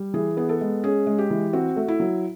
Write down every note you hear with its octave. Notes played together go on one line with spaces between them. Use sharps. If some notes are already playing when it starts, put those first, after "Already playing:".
Already playing: G3
E3 G#4
B3 G#4
A4
G#3
C#4 G#4
G#3
G4
E3
C4 F#4
A3
E4
F#3